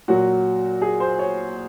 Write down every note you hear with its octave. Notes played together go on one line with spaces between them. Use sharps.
A#2 F#3 F#4
G#4
C5
C#5